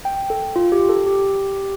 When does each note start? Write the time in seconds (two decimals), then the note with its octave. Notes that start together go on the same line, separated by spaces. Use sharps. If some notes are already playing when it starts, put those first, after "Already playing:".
0.05 G5
0.30 A4
0.56 F4
0.72 G4
0.89 A4
1.06 G4